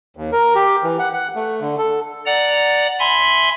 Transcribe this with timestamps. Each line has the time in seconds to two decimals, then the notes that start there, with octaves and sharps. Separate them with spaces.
0.17 D#2
0.32 A#4
0.55 G4
0.83 E3
0.99 F#5
1.13 F#5
1.36 A3
1.61 D3
1.78 A4
2.26 D5 F#5 A#5
3.00 E5 G#5 B5 C6